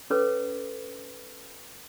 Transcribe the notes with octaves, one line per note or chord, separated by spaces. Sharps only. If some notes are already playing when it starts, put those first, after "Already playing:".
C#4 A4 B4 C#5 D6